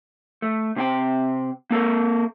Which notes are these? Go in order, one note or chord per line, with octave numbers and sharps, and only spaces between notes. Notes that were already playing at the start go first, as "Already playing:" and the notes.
A3
C3 C4 G5
A#3 A4 A#4